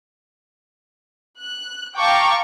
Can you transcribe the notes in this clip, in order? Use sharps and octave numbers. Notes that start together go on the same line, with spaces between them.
F#6
F5 G5 A5 A#5 C#6 D6